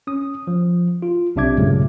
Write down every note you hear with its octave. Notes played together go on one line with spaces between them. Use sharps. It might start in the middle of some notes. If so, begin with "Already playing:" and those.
C#4 D#6
F3
F4
B1 C3 D4 E5 D6 G#6
G2 A#2 C#3 F#3 G#3 A3